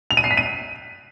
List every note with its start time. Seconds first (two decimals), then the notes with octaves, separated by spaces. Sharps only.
0.11 F7
0.17 D#7
0.24 C7
0.31 B6
0.37 D#7